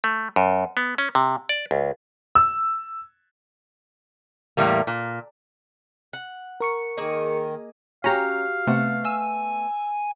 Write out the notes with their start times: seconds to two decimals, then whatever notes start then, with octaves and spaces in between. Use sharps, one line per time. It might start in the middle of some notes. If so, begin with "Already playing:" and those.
0.04 A3
0.36 F#2
0.77 B3
0.98 C#4
1.15 C3
1.49 D5
1.71 C#2
2.35 E6
4.57 E2 A2 G3 A#3
4.87 A#2
6.13 F#5
6.60 A#4 C#6 C#7
6.97 D#3 A#3 G#4 D#5
8.04 C#4 F#4 G4 F5 A#5
8.67 C3 A3 B3 F#5
9.05 G#5 E6